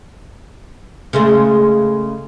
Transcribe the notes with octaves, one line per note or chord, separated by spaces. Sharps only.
C#3 G#3 A3